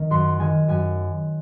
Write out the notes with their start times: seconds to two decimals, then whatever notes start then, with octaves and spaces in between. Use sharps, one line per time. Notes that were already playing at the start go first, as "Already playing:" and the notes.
Already playing: D#3
0.10 F#2 C6
0.40 D#3 G#3 G#5
0.68 F#2 G#5